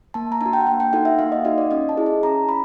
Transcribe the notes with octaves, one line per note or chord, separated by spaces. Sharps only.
A#3 A5
A#5
D4 F#4 A5
G5
F#5
A#3 G5
G5
D#4 F#4 A4 F#5
E5
A#3 F5
D#5
D#4 F#4 A4 D#5
D5
C#4 D#5
A5
E4 G#4
A5
C#4 A#5
B5